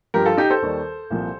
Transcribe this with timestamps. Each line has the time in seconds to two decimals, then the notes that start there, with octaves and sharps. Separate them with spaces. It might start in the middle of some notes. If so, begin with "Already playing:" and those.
0.14 G2 F3 G4 A#4
0.26 F4 A4
0.38 D#4 G4
0.50 A4 C5
0.62 D#2 D#3 G3
1.11 C2 A#2 F3